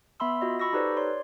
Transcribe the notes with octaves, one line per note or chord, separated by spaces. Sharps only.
B3 E5 B5 C6 E6
F4 F#4 D#5
B5 C#6 E6 A#6
D#4 G4 A4 B4 C5 D5
C#5 D5 C6